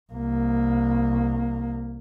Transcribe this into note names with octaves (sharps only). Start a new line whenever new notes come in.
C2 A#3